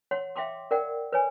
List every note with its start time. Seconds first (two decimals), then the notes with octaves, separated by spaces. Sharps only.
0.11 C#5 F#5 C6
0.36 E5 F5 G5 C6 D6
0.71 A#4 D5 F#5 G5
1.12 B4 C#5 G#5